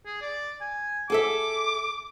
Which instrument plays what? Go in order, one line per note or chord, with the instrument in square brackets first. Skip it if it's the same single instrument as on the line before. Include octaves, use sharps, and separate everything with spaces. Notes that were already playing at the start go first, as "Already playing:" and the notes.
[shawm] G#4
D5
G#5
[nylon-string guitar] G#4 A4 E5 [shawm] D6